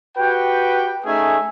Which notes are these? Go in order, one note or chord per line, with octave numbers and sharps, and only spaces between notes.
F#4 G4 B4 G5
A3 C#4 D#4 G#4 E5 G#5